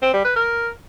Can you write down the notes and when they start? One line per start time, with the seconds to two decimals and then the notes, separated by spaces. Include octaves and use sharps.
0.02 C4
0.13 G3
0.25 B4
0.36 A#4